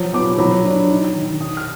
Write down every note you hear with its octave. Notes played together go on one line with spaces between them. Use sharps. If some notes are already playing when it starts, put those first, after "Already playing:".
Already playing: F3 F#3
B3 D6
F#3 B5
D4
D#4
D#3
D#4 D#6
F6